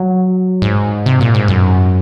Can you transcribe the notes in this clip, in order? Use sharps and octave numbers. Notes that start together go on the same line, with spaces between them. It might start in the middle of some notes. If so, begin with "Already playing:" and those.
Already playing: F#3
G#2
C3
A#2
G#2
F#2